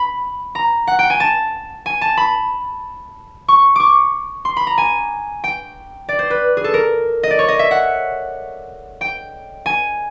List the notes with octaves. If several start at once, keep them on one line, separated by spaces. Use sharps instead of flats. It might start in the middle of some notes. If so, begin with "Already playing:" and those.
Already playing: B5
A#5
F#5
G5
G#5
A5
G#5
A5
B5
C#6
C#6 D6
C6
B5
A#5
G#5
G5
D5
C5
B4
G#4
A4
A#4
D#5
D5
C#5
D#5
E5
F#5
G5
G#5